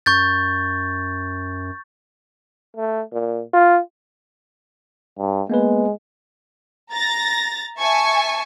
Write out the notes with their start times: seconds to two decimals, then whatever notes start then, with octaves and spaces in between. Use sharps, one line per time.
0.06 F#2 C#6 G6 A6
2.77 A3
3.13 A#2
3.53 F4
5.18 G2
5.50 G#3 A#3 B3 B4
6.91 A#5 A6 A#6
7.80 E5 G#5 A5 C#6